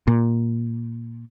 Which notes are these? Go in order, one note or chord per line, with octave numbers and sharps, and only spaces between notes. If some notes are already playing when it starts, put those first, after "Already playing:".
A#2